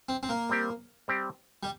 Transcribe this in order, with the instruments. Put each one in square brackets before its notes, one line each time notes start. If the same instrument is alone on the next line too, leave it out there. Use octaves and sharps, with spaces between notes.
[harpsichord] C4
C4
A#3
[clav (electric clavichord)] G3 C4 G4
G3 C4 G4
[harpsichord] G3